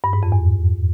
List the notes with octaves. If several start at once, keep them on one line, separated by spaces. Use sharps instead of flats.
G2
G#2
F2
E2